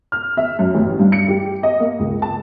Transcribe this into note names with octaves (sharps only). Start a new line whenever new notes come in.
F6
E5
F#2
A1
G2
C#7
G4
D#5
A#3
C#2
A5